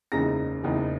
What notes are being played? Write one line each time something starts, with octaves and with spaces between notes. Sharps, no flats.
F#1 E2 C#3 G#3 D#4 A#5 A#6
F#1 E2 C#3 G#3 D#4